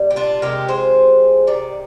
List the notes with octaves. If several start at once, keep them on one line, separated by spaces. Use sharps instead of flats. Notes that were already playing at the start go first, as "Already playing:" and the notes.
Already playing: A#2 G3
G4
D4 F4
C3 F3 G#3 G4 A#4
G#4 C5
C3 D#3 D5